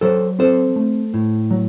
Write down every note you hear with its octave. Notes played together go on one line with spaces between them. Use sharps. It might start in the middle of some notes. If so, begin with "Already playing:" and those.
F#3 A4 C5
C4 A4 C5
A3
A2
F#3